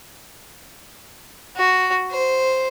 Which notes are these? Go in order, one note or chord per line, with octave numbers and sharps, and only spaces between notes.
F#4
C5